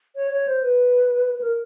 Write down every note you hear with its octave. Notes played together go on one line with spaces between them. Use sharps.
C#5
C#5
C5
B4
B4
A#4